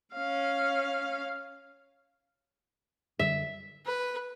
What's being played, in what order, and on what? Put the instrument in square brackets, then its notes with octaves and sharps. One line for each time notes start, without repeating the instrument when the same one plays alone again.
[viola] C#4 F5
[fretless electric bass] F#2 D3 G3 [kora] E5
[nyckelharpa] B4